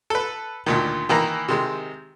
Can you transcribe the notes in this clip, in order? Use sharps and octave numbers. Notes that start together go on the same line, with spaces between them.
A4 B4
D2 A#2 D#3
D#3 E3 A#3 A#5
C3 D#3 G#3